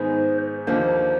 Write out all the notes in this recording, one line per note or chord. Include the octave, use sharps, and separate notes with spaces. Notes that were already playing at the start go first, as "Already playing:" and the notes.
Already playing: G#2 D#3 G#3 B3 C5
D#2 D3 F3 A#3 C5